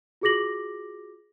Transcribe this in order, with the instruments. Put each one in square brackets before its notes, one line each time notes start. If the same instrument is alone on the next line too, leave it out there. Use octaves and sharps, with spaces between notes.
[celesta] F4 F#4 G#4 D6 A#6 F#7